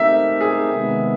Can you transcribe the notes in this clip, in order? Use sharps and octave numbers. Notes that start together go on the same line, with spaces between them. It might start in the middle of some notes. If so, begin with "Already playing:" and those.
Already playing: A3 C4 D#4 G4 A#4 E5
G#4
C3 D#3 G#3 B3